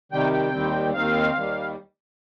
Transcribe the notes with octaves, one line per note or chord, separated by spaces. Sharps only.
C3 D#3 G3 G5
G5
D#2 D#3 G3 C4
D#2 D#3 C4 F5
D#2 D#3 G3